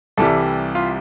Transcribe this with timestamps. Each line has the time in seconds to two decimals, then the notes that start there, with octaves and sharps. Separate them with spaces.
0.18 C2 C3 E3 G3 A4
0.75 F4